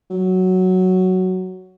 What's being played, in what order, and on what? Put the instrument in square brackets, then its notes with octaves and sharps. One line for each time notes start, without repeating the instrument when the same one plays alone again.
[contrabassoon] F#3